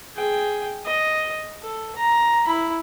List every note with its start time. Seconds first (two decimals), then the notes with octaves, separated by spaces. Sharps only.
0.16 G#4 G5
0.85 D#5
1.61 A4
1.96 A#5
2.47 E4 B5